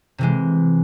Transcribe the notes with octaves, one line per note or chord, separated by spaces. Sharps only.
C3 E3 G#3